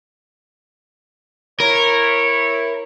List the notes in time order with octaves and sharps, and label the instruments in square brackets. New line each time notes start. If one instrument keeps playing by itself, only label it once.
[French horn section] E4 C#5 [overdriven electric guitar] A#4